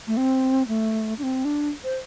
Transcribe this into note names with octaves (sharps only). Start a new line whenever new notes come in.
A3
C4
A3
D4
C4
D4
C5